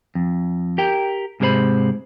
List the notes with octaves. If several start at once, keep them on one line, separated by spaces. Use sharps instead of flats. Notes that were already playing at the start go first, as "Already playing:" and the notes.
F2
G4 A#4 G5
G#2 C3 G#3 A#4 C5 B5